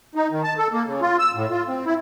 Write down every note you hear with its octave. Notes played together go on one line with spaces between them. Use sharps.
D#4
D#3
A5
A4
A#3
C#3
F4
E6
A2
F4
C4
E4